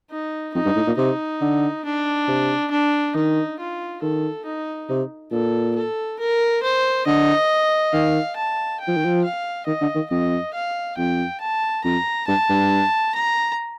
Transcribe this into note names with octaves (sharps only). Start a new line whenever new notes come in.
D#4
F2 D#4
G2
A2
A#2
C3 D#4
D3
D4
C3
D4
D#3 D#4
F4
D#3 A4
D#4
C3
A#2 A4
A4
A#4
C5
D3 D#5
D#3 F5
A5
G5
F3
D#3
F3
F5
D#3 D#5
D3
D#3
F2 D#5
F5
F2 G5
A5
F2 A#5
G2 A5
G2
A#5